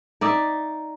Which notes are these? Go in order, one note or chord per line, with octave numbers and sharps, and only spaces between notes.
D#4 D5 E5